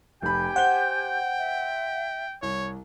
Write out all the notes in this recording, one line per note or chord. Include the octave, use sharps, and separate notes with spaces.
F1 G4 G5 G#5 B5 G6
C5 F#5 G7
E5
C2 C#5